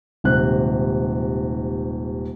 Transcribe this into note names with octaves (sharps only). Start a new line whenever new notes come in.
D#1 G#2 C3 F#6